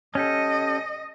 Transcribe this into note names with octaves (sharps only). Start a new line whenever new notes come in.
C#4 G4 A4 D#5